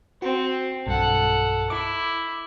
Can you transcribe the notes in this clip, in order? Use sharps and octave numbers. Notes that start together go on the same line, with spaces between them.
C4 F#4
B1 G2 A4 F#5
E4 D6